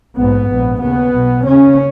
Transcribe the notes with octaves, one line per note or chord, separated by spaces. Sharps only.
A#1 G#2 B3
A#1 G#2
D#2 C#3 B3
B1 B2
D#2 C#3 C#4